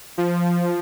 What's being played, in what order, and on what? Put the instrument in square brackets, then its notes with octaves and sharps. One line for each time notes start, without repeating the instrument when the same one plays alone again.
[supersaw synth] F3